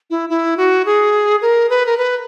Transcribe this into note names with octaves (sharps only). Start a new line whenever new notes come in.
E4
E4
F#4
G#4
A#4
B4
A#4
B4